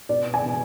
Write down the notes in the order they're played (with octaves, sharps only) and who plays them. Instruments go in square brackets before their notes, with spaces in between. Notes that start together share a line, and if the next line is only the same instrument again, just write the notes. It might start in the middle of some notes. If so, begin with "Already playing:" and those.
[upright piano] B2 D5
G#5
B2